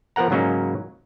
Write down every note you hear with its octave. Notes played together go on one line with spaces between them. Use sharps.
F3 B3 A#4 F#5 A#5
G#2 C#3 F#3 A#3 C#4 D#4